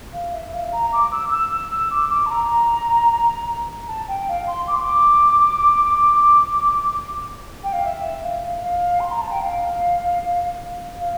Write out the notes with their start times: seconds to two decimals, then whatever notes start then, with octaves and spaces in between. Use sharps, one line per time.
0.12 F5
0.32 E5
0.52 F5
0.72 A#5
0.92 D6
1.11 E6
1.30 E6
1.51 E6
1.71 E6
1.90 D6
2.10 D6
2.26 A5
2.30 A#5
3.87 A5
4.08 G5
4.27 F5
4.47 C6
4.67 D6
4.75 C6
4.84 D6
7.63 G5
7.72 F5
7.84 E5
8.23 F5
8.61 F5
9.00 C6
9.11 A#5
9.21 A5
9.31 G5
9.40 F5
11.00 F5